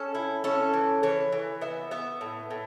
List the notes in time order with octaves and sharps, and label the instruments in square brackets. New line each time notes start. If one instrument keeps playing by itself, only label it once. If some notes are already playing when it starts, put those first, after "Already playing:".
Already playing: [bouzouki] C#4 A4
E4
C#4 A4
E3
E3 C#5
E3
B3 E5
B3 E5
A2
A2